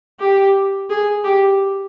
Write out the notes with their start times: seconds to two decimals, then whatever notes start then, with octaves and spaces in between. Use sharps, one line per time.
0.20 G4
0.90 G#4
1.24 G4